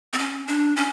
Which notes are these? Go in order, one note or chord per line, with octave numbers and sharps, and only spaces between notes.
C4
C#4
D4
C#4